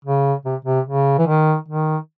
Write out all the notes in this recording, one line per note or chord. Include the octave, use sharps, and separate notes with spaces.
C#3
C3
C3
C#3
E3
D#3
D#3